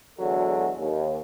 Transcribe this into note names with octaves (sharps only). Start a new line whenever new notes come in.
E2 D3 F#3 G#3 F#4 A4
D#2